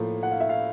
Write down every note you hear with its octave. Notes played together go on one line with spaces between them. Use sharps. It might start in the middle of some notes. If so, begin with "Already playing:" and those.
Already playing: A2 F3 A#3
F#5
F5
E5
F5